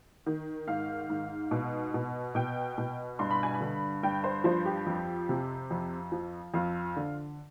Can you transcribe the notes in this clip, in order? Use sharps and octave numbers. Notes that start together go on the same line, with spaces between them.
D#3
G#2 F5
G#2
B2
B2
B2 G5
B2
G2 C6
B5
G#5
B5
D3
G2 G5
C5
F3 C5
G4
F2
C3
F2
F3
F2 F4
D3